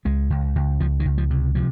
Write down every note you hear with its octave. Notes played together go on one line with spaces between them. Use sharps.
C#2 G#3
C#2
C#2
C#2 F3
D#3
C#2
F3
C3
C3 F3